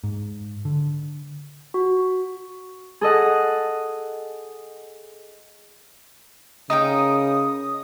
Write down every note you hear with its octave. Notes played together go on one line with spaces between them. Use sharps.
G#2
D3
F#4
G#4 A4 D#5 F#5
C#3 D#4 A#4 G5 D#6